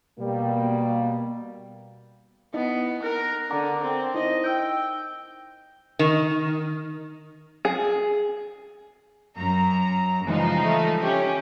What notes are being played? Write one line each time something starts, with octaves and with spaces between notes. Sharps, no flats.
B2 G3 A#3
B3 D#4 E4 D#5
A#4 F#6 A#6
D3 F#5 A#5 D6
C4
D#4 E4 C5 D#5
G5 E6 G6
D#3
G#4
F#2 A#5
C#3 E3 F3 G3 G#3 D#4
A3
C#4 G4